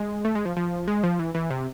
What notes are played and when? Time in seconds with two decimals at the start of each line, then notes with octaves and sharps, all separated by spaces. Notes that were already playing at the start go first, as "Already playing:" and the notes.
Already playing: G#3
0.25 A3
0.35 G#3
0.45 F3
0.57 F3
0.88 G#3
1.03 F3
1.19 E3
1.34 E3
1.50 C3